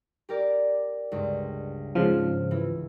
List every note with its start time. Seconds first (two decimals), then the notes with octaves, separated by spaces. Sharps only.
0.29 G4 A#4 D5
1.12 C#2 G2
1.95 G#2 C#3 F3 F6
2.51 E3